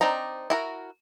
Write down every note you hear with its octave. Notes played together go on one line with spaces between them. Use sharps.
C4 D4 D#4 A#5
E4 F#4 A#4